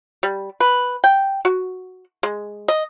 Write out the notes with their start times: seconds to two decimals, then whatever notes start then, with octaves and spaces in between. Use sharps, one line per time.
0.23 G3
0.60 B4
1.04 G5
1.45 F#4
2.23 G#3
2.68 D#5